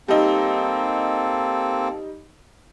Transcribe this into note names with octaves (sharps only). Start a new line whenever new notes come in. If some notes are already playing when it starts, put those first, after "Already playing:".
G3 A#3 C4 D#4 A4